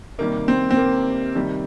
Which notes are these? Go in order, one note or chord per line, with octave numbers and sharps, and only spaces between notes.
C3 D#3 G3 A#3
C4
C4
A#3
C3 D#3 G3